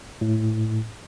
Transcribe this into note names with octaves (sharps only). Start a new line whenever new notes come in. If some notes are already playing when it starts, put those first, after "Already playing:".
A2